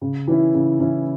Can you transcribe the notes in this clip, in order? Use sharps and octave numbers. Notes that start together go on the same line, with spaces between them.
C#3
E3 C#4 E4
C#3
E3 C#4 E4